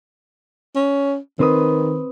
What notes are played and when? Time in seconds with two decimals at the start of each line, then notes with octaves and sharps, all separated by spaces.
0.75 C#4
1.39 D#3 C4 B4 D#6